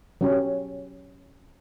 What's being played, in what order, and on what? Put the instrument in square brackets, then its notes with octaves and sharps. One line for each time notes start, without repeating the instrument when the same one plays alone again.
[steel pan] F#3 C#4 G4